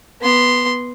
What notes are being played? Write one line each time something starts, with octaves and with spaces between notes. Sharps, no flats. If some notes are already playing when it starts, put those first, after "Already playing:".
B3 C6